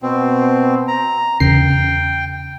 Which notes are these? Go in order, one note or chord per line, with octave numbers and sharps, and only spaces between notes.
B2 C4
A#5
E2 C#3 G5 C7